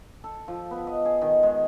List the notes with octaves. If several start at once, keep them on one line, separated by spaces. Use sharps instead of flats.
A4
F3
B3
D#5
G#4
D#3
G#3